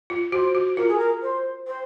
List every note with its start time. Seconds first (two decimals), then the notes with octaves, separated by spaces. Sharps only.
0.10 F4
0.32 F#4 C5
0.55 F#4
0.77 F4 A#4
0.88 G#4
0.98 A#4
1.22 C5
1.67 C5